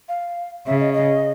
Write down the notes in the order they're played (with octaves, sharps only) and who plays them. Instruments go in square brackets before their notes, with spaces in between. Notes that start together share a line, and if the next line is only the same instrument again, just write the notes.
[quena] F5
[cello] C#3 [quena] E5
[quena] D#5
D#5